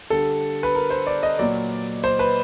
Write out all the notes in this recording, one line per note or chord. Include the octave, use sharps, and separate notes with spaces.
D3 G3 A4
B4
A#4
C5
D5
D#5
A#2 F#3 D5
C5
B4